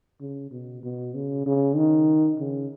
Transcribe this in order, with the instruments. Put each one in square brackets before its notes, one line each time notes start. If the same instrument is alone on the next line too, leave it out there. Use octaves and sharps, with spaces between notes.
[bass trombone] C#3
B2
B2
C#3
C#3
D#3
C#3